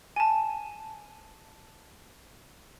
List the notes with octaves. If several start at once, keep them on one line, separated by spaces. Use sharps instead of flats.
G#5 A5